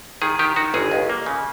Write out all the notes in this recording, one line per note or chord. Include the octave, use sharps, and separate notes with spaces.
D#3 G#4
D#3 G4
D#3 F#4
G1 G#4
C#2
A#3
C#3